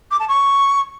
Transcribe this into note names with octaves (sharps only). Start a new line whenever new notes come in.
D6
A5
C#6